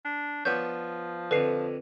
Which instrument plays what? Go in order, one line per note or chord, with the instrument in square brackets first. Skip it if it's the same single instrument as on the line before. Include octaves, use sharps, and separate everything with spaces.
[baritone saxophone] D4
[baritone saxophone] F3 [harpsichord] B3 D4 C#5 [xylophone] G6
[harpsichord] F2 D3 [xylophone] B4 C7